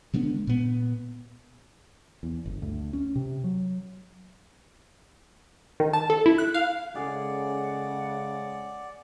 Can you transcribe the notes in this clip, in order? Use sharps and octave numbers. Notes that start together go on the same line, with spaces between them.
D3 G#3 B3 D4
A#2 B3
E2
G1
D2
C#4
C3
F#3
D#3
A5
A4
E4
F#6
F5
C#3 G#3 G#4 A4 D5 F#5